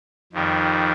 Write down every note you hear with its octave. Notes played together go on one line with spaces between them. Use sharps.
F2 D#3 G3